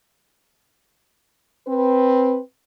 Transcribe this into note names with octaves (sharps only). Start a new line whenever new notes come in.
C4 B4